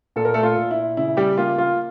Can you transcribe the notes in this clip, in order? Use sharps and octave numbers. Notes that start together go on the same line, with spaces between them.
A#2 A4
A#4
A3 A4
F4
A#2
E4
C#3 E4
G3 G4
A#3 F4
F4